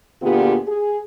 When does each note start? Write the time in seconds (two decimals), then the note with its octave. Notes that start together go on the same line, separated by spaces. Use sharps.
0.21 D2 A#2 B3 F4 G4 G#4
0.67 G#4